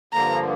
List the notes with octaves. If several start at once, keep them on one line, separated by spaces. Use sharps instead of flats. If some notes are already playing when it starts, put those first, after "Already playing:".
G2 D3 F3 A#3 A#5